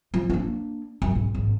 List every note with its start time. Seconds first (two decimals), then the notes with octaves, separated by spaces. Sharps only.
0.14 F3 F4
0.30 A#3 D4
1.02 F#2
1.15 G#2
1.35 G#1